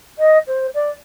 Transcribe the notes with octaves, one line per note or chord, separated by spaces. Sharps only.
D#5
C5
D5